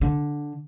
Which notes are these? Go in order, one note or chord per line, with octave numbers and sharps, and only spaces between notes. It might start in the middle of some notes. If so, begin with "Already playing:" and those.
D3